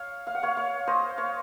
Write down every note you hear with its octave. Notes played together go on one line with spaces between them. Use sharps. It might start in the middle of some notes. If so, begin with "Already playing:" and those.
Already playing: C#5 F5
F5
F#5
C#5 F5
C#5 F5
C5 D#5
C#5 F5